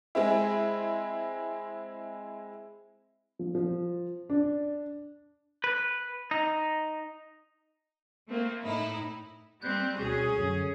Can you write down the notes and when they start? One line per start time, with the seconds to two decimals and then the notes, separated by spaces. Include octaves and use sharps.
0.15 G#3 C4 E4
3.39 F3
3.55 F3
4.30 D4
5.64 B4
6.31 D#4
8.29 A3 A#3 C4
8.62 A2 D#4 E4
9.62 G3 C4 F#6 G6
9.98 D2 B2 C#4 F#4 G#4
10.37 F#2 D3 F#3